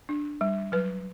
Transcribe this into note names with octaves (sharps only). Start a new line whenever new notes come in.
D4
G3
F#3 B4